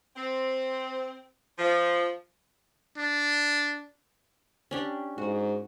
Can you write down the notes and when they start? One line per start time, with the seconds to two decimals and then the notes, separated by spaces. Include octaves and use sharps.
0.16 C4
1.59 F3
2.98 D4
4.71 C#4 D4 G4
5.18 G#2 F#4